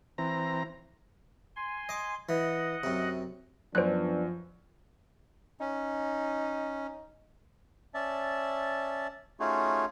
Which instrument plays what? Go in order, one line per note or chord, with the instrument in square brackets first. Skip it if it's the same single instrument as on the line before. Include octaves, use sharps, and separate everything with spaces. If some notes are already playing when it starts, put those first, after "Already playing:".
[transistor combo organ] E3 C4 A#5
[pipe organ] G#5 C6
[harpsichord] D#5 D6
[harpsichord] E3 [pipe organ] D#5 F#5
[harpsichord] F#2 C3
[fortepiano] F#2 [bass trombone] F3 [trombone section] B3 D4 [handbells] C5 F#6
[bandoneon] C#4 [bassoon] D#4
[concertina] C#4 D5 E5 A5
A3 C#4 D#4 F4 F#4 G#4